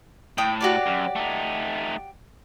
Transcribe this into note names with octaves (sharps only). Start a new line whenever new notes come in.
A2 G5 D#6
F#4 G4 D5
F#2
A3 D#4